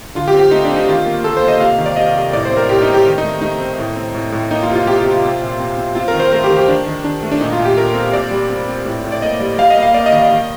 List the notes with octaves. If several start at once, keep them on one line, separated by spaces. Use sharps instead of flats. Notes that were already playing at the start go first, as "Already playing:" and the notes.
D3 F4
G4
C4
G4
A3 D#4
D4
C4
D#4
D#3 F4
A#3
A#3 A4
C5
A#3
D#5
C3 F5
D#3
D5
C3 D#5
C3
A2 D5
C5
C4
A#4
A2 G4
D#4
C4
G4
D#3
D#4
A3
A3 D#4
C4
A2
C4
A2
A2
A#3 D#4
F4
C3
F4
C3 G4
G4
C3
F4
C4
A#2
C4
C4
C4 F4
A#4
D#3
C5
A3 A#4
G4
D#3
G4
D#3 D4
D#3
D#3 D4
A3
D4
A#2 D#4
F4
A#2
G4
A#2 A#4
C4
A#2 D5
G3
C4
C4
A2
A2
D5
A#3 D#5
G3
G3 F5
D#5
A#3
F5
A#3 D5
D#5
D#3
D#5
D#3